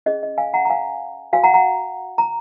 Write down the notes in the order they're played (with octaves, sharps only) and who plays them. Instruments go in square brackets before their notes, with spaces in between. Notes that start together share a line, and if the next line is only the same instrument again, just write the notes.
[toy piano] C#4 G#4 C#5 D#5
D#5
F5 G#5
F#5 A#5
A#5
F5 G#5
F#4 C#5 F5 G#5
F#5 A#5
F#5 A#5
A#5